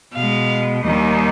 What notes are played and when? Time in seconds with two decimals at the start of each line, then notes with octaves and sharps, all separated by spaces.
0.13 B2 F5
0.18 G#3
0.83 D#2 D#3 G3